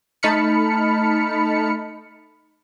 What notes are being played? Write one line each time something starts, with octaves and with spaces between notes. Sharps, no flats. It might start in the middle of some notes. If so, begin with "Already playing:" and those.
A3 D#4 A5 B5 F6 C#7